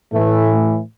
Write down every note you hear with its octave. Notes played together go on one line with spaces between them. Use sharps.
A2 E3 A3